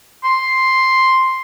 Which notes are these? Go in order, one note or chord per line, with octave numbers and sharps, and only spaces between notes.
C6